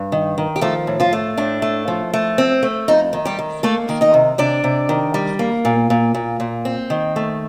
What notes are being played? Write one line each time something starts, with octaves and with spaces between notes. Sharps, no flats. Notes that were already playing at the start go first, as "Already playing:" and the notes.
Already playing: G2
D#3
D#3
G4
F3 A3 A4
A2
F3 F4
A3
A2 D4
A3
F3
A3
C4
A3
F2 D#4
D#3
G3 G4
D#3
A3 A#3 A4
D#3
D#4 D#5
C3
C3 D4 D5
C3
D#3
G3
A#3
A#2
A#2
A#2
A#2
C4
D#3
A3